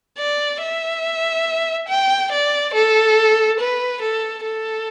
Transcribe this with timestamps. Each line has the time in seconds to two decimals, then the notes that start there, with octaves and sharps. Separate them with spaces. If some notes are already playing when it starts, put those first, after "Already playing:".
0.18 D5
0.61 E5
1.88 G5
2.31 D5
2.74 A4
3.59 B4
4.02 A4
4.44 A4